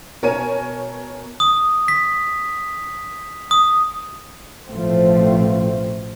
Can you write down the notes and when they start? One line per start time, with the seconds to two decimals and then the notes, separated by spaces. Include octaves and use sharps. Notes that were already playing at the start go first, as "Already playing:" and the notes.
0.23 B2 A#4 C#5 G#5 A5 D#7
1.40 D#6
1.88 B6
3.51 D#6
4.69 A1 B2 F3 A3 C4